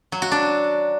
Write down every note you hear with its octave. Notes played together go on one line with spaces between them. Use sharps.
F#3
F#4
D4